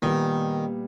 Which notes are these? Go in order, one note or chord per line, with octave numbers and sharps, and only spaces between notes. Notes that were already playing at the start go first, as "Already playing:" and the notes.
A#2 D#3 G3 B3